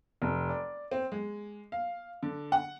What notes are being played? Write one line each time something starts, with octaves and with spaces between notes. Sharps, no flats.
F1
D5
C4
G#3
F5
D3
F#5